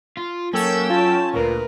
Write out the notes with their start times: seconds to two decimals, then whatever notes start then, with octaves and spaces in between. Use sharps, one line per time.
0.17 F4
0.53 F#3 A#3 C#4 A4 G5 E6
0.90 F4 A5
1.33 D2 A#2 A#4 B4